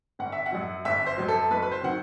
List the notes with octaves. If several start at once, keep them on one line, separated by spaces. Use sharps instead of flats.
G1 F#5
E5
F#5
F#2 F#3
G1 E5
C5
F#2 F#3
A4
F#1 B4
B4
C5
D#3 F#3 F#5